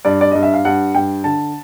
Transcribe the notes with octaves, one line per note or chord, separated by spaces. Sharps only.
G2 D5
D5
G2 D#5
E5
F5
G2 F#5
G2 G5
D3 A5